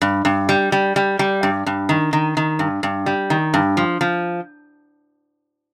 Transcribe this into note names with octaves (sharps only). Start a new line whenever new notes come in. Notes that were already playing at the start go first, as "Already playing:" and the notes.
G2
G2
G3
G3
G3
G3
G2
G2
D#3
D#3
D#3
G2
G2
G3
D#3
G2
F3
F3